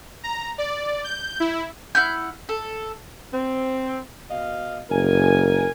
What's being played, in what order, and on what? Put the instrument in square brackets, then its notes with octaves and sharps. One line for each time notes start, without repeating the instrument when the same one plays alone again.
[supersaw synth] A#5
D5
G6
E4
[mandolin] E4 F#5 F6 G6
A4
[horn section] C4
B2 D#5 F5
[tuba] F#1 [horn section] A#4 G#5